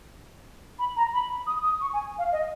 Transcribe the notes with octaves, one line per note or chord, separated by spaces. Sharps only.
B5
A#5
B5
B5
D#6
D#6
C#6
G#5
F5
D#5